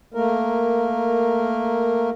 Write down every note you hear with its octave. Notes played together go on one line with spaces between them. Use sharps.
A3 A#3 A#4